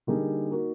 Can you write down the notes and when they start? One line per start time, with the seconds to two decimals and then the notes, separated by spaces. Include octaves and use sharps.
0.07 D3 G3 A#3 D#4 G#4
0.51 A#3 D#4 F#4 A#4